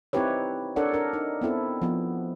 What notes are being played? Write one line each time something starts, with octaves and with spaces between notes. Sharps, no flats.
C4 D#4 E4 G4 B4 C#5
D4 A4 A#4 C#5 D5 F#5
D4 A#4
D#4
B3 C4 E4 A4
F3 B3